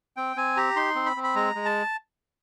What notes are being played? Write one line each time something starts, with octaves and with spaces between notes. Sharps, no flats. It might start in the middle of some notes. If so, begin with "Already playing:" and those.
C4 G5
C4 G#5
G4 A#5
D#4 C6
C4
B5
C4
B5
G#3 A#5
G#3
A5